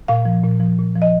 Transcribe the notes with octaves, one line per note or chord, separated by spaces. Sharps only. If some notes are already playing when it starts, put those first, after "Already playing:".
A#2 F5
F3
A#2
F3
A#2
F3
D#5